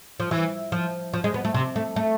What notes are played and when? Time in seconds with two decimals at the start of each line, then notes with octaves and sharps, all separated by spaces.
0.20 F3
0.31 E3
0.72 F3
1.13 F3
1.24 G#3
1.34 B3
1.45 A3
1.54 C3
1.76 A3
1.96 A3